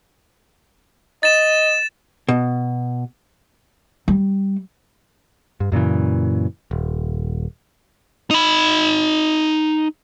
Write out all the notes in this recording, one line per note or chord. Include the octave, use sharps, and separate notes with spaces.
D#5 A6 E7
B2
G3
G2
F#2 A#2 C#3 E3
D#1
D#4 B5